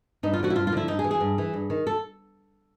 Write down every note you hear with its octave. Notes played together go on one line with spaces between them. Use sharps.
G2 D#4
F4
D3 F3 F#4
E4
G2 F4
F4
D3 F3 E4
G2 D#4
G#4
E3
G#4
G2
E3
G2
D#3
A4